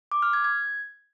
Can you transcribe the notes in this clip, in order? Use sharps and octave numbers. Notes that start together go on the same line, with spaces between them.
D6
F6
G#6
G#6